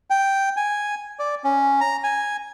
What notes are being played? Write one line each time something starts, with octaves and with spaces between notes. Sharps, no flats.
G5
G#5
D5
C#4
A#5
G#5